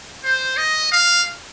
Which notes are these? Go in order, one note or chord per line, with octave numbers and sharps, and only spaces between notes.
C5
D#5
F5